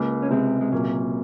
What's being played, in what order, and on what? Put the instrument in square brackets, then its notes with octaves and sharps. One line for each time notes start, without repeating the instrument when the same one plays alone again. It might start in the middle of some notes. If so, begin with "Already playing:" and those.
Already playing: [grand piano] C#2 [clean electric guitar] A#3
[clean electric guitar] C#4
[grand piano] C3 [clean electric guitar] G#3 C4
[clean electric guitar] G#3
[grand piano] A#2 [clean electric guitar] F#3 A#3